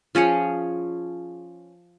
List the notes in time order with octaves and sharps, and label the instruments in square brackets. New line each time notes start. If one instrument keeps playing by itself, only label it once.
[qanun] F3 C#4 G#4 C#5